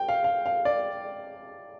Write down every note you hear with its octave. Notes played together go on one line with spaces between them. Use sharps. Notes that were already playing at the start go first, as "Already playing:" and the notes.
Already playing: G5
F5
F5
F5
D5